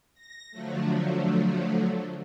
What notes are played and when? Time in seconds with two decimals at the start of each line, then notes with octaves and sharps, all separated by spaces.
0.14 A#6
0.51 D3 F3 F#3 A3